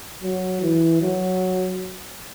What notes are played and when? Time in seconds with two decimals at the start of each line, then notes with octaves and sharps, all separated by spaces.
0.23 F#3
0.62 E3
1.01 F#3